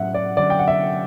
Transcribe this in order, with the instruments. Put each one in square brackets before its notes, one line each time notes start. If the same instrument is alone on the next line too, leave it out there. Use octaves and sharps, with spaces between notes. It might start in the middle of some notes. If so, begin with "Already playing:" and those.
Already playing: [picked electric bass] A2 F#3 C#4 [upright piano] E5 F#5
[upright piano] D5
[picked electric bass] D3 F#3 C#4 [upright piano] D5
[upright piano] G5
F#5
E5